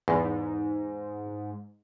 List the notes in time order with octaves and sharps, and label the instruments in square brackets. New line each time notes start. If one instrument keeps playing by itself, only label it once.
[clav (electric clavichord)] E2 [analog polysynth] G#2